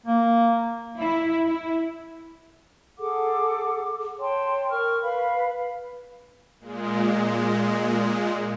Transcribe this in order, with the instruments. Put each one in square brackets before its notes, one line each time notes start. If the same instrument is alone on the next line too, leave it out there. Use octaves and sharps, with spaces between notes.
[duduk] A#3
[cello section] E4
E4
[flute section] G#4 A4 F#5 D6
C#5 G5 A5 C6
A#4 C#6 F6
B4 F5 B5
[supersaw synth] A#2 G#3